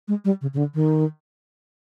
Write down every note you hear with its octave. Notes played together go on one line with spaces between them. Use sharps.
G#3
G3
C#3
C#3
D3
D#3